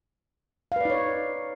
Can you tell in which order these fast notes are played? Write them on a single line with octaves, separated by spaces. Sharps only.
F5 B4 D5 D#4 C#5